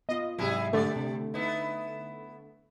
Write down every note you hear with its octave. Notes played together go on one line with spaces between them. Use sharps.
B3 F4 D#5 F5
G#2 C3 F#3 G3 E4 G#4
D3 G3 A3 D5
C3
B3 D#4 E4